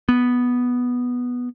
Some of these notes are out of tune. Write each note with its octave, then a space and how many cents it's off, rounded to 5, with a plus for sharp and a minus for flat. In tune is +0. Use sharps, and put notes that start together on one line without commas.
B3 -5